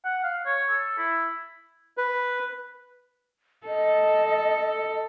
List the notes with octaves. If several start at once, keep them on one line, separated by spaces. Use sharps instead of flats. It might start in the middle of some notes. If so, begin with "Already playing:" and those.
F#5
F5
C#5
A4
E4
B4
A4 D#5